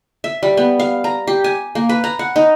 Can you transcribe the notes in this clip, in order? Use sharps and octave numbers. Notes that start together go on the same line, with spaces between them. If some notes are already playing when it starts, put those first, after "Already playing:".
E5
G3
B3
F5
A#5
G4
G#5
A#3
B4
A#5
F#5
D#4